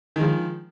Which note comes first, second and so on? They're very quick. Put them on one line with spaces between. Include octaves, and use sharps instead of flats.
D#3 G#3 F3